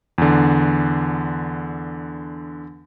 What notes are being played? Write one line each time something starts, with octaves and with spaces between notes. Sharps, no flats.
E2 D3